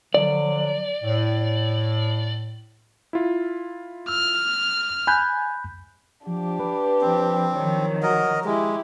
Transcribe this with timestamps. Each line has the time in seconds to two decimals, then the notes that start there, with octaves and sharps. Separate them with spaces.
0.14 D3 F3 F#3 D5
1.03 A2
3.13 E4 F4
4.08 E6 F6
5.07 G#5 B5 F#6 G6
6.27 F3 D4 G4
6.60 B4
7.01 F3 C4
7.55 D#3 F3 F#3 C#5
8.03 F#4 A#4 D#5
8.45 G#3 E4 G4